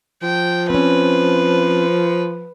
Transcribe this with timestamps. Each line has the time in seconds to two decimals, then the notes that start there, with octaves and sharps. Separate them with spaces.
0.23 F3 G5
0.70 C4 C#4 B4